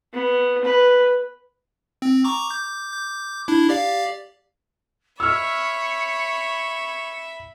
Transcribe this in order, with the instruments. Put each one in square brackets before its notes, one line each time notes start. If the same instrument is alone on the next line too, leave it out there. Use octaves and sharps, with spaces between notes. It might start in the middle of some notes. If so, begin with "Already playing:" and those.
[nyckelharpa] B3
B4
[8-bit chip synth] C4
A#5 C#6 D6
D6 G6
D6 G6
D4 E4
G4 D5 F5
[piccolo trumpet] C#5 [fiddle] E5 B5 [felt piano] E6 F6 [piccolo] C#7